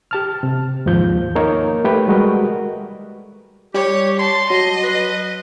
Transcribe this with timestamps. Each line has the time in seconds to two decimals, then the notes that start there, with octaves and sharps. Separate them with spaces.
0.11 G4 A5 F6
0.43 C3
0.86 D#2 G#2 F3 G6
1.35 A#3 D#4 A#4 C#5
1.84 A3 G4 B4 G5
2.08 G3 G#3 F#4 A#4 B4 D#5
3.74 G3 G4 C#5
4.19 A5 C6
4.50 F#3 D#5
4.84 B4